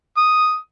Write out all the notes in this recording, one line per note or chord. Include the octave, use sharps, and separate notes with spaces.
D#6